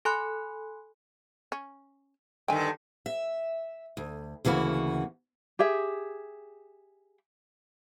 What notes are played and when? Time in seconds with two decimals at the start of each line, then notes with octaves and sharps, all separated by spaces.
0.05 A4 G#5 B5 C6 F#6
1.52 C#4
2.48 G2 D3 D#3 G5 G#5
3.06 E5
3.97 D2
4.45 D2 C#3 E3 A#3 F#4
5.59 G4 G#4 E5